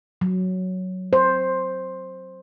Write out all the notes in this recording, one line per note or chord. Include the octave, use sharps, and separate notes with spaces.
F#3
C5